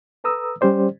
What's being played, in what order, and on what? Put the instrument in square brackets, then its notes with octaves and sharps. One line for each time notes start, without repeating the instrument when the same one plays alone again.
[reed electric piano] A4 B4 A#5 D#6 E6
G3 C#4 G4 C5 D5